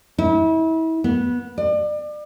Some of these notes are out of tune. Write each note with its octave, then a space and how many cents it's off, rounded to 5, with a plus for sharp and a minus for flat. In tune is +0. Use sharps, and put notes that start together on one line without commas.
E4 -35
B3 -15
D5 +35